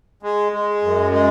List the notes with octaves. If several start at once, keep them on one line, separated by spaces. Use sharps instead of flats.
G#3
G#3
F#2
G#3